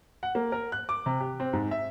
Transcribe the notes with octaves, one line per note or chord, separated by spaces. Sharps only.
F#5
A#3
A#4
F#6
D6
C3
G4
C4
G#2
E5